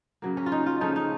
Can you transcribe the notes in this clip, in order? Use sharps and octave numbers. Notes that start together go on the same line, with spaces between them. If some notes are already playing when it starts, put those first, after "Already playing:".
C#3 F#3 A#3
C#4
F4
D#4
F4
C#3 F3 A3 C#4 D#4
D#4